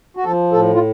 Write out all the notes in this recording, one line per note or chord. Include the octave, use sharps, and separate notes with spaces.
F#4
F3 A4
A2 A4
F4